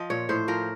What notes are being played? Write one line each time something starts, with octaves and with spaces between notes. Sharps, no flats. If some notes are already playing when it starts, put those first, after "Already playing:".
Already playing: F3 D#5
A#2 C#5
A2 C5
F3 A#4